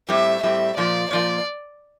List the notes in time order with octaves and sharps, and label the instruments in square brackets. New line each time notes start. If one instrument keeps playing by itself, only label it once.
[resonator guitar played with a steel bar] A2 G3 C4 [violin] E5
[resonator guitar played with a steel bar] A2 G3 C4 [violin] E5
[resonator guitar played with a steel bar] A#2 F3 A#3 [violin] D5
[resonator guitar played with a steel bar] A#2 F3 A#3 [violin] D5